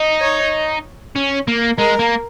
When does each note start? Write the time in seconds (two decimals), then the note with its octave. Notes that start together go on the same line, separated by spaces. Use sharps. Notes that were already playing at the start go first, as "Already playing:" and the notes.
Already playing: D#4
0.21 C#5
1.16 C#4
1.48 A#3
1.78 G#3 A#4
1.99 A#3